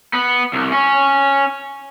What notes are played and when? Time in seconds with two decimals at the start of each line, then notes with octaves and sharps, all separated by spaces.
0.13 B3
0.53 C2
0.72 C#4